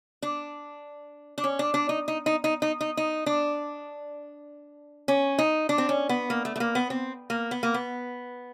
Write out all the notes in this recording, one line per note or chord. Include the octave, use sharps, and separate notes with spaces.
D4
D4
C#4
D4
D4
D#4
D#4
D#4
D#4
D#4
D#4
D#4
D4
C#4
D#4
D4
C4
C#4
B3
A#3
A3
A3
A#3
B3
C4
A#3
B3
A#3
B3